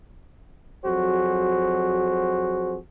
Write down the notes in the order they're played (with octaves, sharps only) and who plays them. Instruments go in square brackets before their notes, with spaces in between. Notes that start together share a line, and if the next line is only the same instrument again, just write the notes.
[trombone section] F2 F#3 F#4 G#4 C5